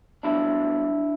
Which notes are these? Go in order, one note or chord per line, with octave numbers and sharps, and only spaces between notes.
C2 B2 F#3 D4 E4